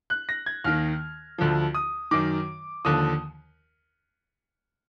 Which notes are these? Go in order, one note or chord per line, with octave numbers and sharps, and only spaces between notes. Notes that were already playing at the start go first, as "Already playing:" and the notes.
F#6
A#6
G#6
D#2 D#3 F6
D2 D3 F3
D#6
F#2 D#3 D6
D#2 D3 F3 D#6